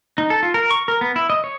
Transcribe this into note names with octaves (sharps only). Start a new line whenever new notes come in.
D#4
A4
F4
A#4
C#6
A#4
B3
E4
D#5
C#5